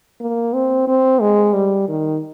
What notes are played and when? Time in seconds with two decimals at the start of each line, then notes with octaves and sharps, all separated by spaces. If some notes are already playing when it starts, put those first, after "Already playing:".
0.21 A#3
0.54 C4
0.88 C4
1.21 G#3
1.54 G3
1.88 D#3